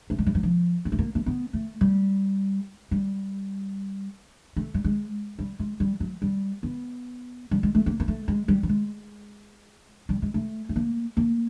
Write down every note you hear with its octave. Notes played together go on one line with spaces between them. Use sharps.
A3
G#3
G3
F#3
F3
A#3
A3
A#3
A#3
B3
A3
G3
G3
A3
G3
G#3
G3
G#3
G3
F#3
G3
B3
G3
G#3
A3
A#3
A#3
A3
G#3
G3
G3
G#3
G3
G#3
A3
A3
A#3
A#3